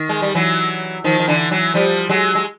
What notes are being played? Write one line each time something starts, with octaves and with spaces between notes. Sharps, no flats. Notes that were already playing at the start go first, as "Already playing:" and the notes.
Already playing: D#3
G#3
G3
E3 F#3
D#3 F3
D#3
D3 E3
E3 F#3
F3 G3
F#3 G#3
G#3